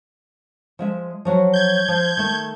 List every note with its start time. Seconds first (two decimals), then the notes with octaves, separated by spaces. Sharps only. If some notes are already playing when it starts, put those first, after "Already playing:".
0.79 F3 G#3 E5
1.25 F3 F#3 F#4
1.53 G6 G#6
1.88 F3
2.17 D#3 A3